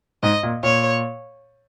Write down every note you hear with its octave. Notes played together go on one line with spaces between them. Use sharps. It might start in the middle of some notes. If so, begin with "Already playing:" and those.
G#2 D#5
A#2
A#2 C#5